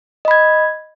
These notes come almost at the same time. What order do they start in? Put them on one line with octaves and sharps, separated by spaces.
D#5 B5 G#6